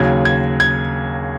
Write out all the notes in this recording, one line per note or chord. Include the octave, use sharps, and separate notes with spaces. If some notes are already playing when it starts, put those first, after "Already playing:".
Already playing: D#2 C#3 F#3 G#6
G#6
G#6